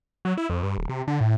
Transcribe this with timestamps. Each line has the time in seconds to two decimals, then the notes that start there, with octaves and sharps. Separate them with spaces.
0.25 F#3
0.37 E4
0.50 F2
0.63 G2
0.78 D1
0.89 C3
1.08 D3
1.21 A2